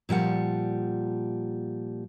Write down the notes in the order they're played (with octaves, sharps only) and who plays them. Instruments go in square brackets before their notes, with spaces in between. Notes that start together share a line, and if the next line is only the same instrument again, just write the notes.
[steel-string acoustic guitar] A#2 F3 G3 F#5